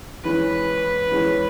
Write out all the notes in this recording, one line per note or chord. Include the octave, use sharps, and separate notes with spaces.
E2 E3 G#3 C#4 B4
E2 E3 G#3 C#4